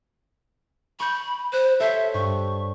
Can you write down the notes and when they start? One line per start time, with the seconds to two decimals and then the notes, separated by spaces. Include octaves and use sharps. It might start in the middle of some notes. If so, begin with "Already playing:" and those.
1.00 B5 C#6 G6
1.53 C5 F#6
1.80 A4 C5 C#5 E5
2.14 G2 C#6